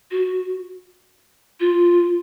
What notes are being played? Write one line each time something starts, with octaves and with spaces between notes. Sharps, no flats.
F#4
F4